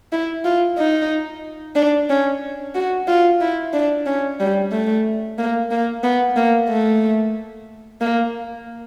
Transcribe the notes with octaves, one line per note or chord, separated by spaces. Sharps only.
E4
F4
D#4
D4
C#4
F#4
F4
E4
D4
C#4
G3
A3
A#3
A#3
B3
A#3
A3
A#3